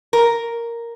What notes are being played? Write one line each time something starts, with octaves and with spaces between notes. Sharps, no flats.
A#4